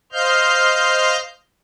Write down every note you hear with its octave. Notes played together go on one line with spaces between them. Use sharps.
C5 D#5 F5 F6 G6